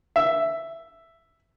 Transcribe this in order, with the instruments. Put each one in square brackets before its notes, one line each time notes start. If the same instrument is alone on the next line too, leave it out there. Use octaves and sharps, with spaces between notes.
[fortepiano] E5